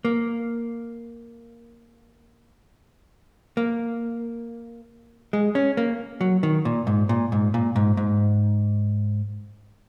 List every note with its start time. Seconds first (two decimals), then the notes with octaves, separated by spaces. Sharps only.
0.05 A#3
3.57 A#3
5.33 G#3
5.55 C#4
5.77 A#3
6.21 F#3
6.43 D#3
6.65 A#2
6.87 G#2
7.09 A#2
7.32 G#2
7.54 A#2
7.76 G#2
7.97 G#2